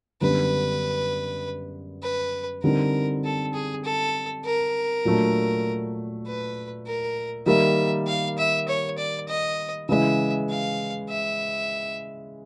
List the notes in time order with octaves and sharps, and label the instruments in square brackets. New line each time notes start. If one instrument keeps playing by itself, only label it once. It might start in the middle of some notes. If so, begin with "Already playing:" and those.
[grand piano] F#2 D3 G3 B3 D4 [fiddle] B4
[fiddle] B4
[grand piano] D3 G3 C4 D#4 [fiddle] A#4
[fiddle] A4
G#4
A4
A#4
[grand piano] A#2 F#3 A3 D4
[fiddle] B4
A#4
[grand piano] D#3 G3 A#3 [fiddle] E5
[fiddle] F5
E5
C#5
D5
D#5
[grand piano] C#3 E3 G#3 [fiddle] E5
[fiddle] F5
E5